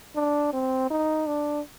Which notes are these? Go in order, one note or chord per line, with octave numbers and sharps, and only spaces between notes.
D4
C4
D#4
D4